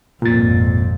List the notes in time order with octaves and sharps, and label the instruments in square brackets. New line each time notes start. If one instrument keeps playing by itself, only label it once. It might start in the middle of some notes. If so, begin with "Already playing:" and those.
[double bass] G#1 F2 [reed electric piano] A#2 A6